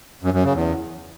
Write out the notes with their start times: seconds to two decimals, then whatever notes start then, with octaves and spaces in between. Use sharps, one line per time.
0.23 F#2
0.33 F#2
0.44 C#3
0.54 E2